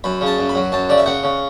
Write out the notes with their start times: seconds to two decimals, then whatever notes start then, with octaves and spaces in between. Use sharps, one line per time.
0.04 F#2 B5
0.21 C#3
0.26 A5
0.38 F#2
0.49 B5
0.55 F#3
0.72 F#2 A5
0.89 C#3 D5
0.98 E5
1.06 C#3 F#5
1.23 C#3